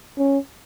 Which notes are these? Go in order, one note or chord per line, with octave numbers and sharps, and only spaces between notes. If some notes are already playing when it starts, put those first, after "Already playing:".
C#4